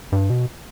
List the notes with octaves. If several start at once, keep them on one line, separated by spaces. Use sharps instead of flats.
G2
B2